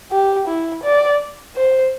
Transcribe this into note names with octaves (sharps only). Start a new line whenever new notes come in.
G4
E4
D5
C5